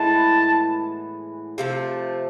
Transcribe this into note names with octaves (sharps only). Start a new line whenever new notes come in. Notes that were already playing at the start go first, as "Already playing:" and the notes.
Already playing: A2 E3 G#3 B3 A5
C3 F3 A3